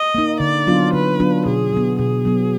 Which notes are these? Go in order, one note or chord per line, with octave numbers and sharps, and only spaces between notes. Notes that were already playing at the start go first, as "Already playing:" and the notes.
Already playing: D#5
A#3 D#4
D3 D5
F#3 B3 D4 F4
D3 B4
F#3 B3 D4 F4
B2 G#4
F#3 B3
B2 G#4
F#3 B3